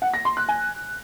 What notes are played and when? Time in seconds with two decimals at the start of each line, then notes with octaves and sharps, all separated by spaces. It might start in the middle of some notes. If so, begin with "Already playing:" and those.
0.02 F#5
0.14 A#6
0.25 C6
0.37 F#6
0.49 G#5